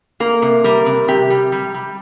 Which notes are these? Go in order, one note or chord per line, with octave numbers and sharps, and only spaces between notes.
A#3 A#4
C3
G3 A#4
C3
C3 G4
G3
G3
G3